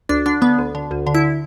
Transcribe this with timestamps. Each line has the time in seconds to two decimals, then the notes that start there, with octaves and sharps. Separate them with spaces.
0.09 D2 D4
0.26 D3 D4
0.41 D3 B3
0.59 D2
0.75 D3
0.91 D2
1.07 D3
1.14 E4